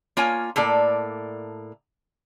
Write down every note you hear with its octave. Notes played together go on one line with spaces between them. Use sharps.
A#3 F4 C#5 G#5
A2 A#3 A4 D5